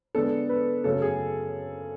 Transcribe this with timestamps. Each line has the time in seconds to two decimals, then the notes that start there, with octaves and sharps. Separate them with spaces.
0.15 D3 G#3 B3 D4 A4
0.49 B4
0.84 F#2 C#3 F#3 A3 C#4 A4
1.02 G#4